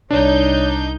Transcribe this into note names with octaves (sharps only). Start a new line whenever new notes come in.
C2 D4 D#4 C#5 G6